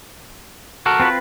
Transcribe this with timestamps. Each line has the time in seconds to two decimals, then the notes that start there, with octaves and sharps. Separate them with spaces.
0.86 F#4 A4 A#4
1.00 C4 F4 B4